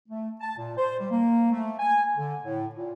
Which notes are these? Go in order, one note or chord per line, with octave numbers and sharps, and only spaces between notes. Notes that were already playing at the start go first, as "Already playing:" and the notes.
A3
A5
A#2
C5
G3
A#3
A3
G#5
D3
A2
A#2